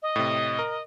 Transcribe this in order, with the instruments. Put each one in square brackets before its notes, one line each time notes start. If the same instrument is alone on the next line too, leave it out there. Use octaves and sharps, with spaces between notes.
[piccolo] D#5
[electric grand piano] A2 C3
A#4